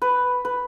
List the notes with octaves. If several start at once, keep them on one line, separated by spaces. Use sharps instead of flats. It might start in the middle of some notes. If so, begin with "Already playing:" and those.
B4
B4